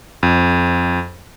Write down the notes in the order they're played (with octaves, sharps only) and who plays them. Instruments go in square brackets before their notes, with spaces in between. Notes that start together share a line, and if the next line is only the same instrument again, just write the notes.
[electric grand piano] F2